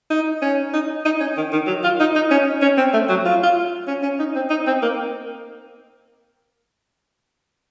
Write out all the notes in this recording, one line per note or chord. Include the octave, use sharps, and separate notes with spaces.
D#4
C#4
D#4
D#4
C#4
D#3
D#3
F#3
F4
D#4
D#4
C#4
C#4
C4
A3
F#3
F4
F4
C#4
C#4
D#4
C4
D#4
C4
A#3